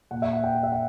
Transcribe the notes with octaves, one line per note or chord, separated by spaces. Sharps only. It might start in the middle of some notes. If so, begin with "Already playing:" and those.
A#2 F#5
E5
F#5
G5
F#5
E5
F#5